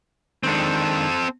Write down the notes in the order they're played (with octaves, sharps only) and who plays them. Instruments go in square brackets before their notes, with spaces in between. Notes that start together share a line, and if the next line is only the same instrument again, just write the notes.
[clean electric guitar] D#3 G#3 D4 [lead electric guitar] C4 A4